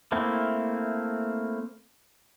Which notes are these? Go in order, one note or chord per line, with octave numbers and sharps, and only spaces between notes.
A3 A#3 C4 E4